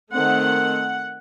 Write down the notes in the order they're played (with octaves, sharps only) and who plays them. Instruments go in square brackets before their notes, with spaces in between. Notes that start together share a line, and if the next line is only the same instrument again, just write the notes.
[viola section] D#3 A3 C4 F#5